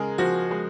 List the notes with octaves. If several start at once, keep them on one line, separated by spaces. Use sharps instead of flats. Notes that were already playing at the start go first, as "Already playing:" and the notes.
Already playing: C#3 G#3 G#4 A#4
F3 F#4
G#3